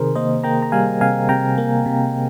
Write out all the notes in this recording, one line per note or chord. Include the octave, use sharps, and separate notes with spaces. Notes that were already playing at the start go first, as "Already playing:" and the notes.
Already playing: C3 D#3 G#4 A#4 C5
A#3 C5 D#5
A#3 G5 A#5
A#5
G3 F5 G#5
C3 F5 G#5
C3 G5 A#5
A#3
C3